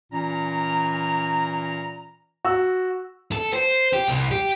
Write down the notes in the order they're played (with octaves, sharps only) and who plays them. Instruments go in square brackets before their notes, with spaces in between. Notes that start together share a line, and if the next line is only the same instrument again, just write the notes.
[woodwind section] A#2 E3 C#4 A#5
[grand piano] F#4 E6
[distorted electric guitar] A4
C5
G4
C2
G4